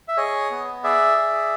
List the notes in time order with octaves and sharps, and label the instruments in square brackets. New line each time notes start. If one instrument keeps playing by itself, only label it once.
[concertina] E5
G#4 C#5 D#5
B3
G#4 D5 E5
G#4